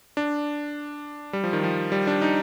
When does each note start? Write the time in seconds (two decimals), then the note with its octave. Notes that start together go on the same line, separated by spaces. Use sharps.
0.17 D4
1.33 G3
1.44 F3
1.53 D#3
1.64 F3
1.92 G3
2.07 D4
2.21 D#4